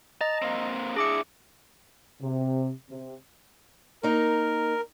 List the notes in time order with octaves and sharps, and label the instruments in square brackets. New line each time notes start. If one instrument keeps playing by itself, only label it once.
[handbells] D#5 A#5 [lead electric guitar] A5
[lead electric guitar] A#3 C4
[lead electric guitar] D4 E4 [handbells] G#4 D6 C#7
[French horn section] C3
C3
[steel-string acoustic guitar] A#3 D#4 [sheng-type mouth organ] A#4